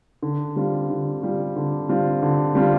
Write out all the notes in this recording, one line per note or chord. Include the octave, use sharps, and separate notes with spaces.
D3
G3 C4 F4
D3
G3 C4 F4
D3
G3 C4 F4
D3
G3 C4 F4